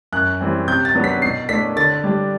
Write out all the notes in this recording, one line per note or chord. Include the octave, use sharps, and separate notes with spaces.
F#2 F#6
E3 G3 C4
C3 G6
A6
F#3 B3 D4
B6
B2 C7
A3 D4 B6
D3 A6
G3 D4